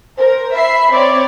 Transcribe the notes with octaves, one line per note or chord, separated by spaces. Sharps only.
A#4 C5
E5 B5 C7
C4 C#5 D5